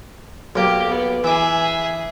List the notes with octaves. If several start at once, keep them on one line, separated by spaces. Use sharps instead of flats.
B1 A#3 G4
B3
E3 G#4 E5 D6